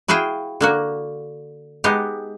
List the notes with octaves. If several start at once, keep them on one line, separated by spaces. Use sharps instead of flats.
E4 F#4 G#4 F5 G5
D3 A#3 F#4
G#3 B3 D#4 G4